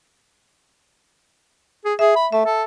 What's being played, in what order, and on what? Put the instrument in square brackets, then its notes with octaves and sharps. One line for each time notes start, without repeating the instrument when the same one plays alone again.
[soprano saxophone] G#4
[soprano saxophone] G#4 [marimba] E5
[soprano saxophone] B5
[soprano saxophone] A3 [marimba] E5
[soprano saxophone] A4